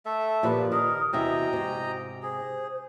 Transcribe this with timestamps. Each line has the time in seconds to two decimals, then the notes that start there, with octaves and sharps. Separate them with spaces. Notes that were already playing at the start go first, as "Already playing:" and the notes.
0.06 A3 A4 E5
0.43 A#2 F3 G4 B4
0.72 D#3 A#4 D#6
1.13 E2 C3 F#4 D#5 E5 G5 A#5
1.53 G#2 C3
2.23 G#4 C5